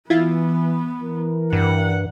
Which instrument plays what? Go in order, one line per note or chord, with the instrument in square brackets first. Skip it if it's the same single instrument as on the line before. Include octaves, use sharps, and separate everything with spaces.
[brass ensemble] E3 [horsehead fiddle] B3 [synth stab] E4 F4
[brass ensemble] E3 A#4
[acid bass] G2 [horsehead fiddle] F#5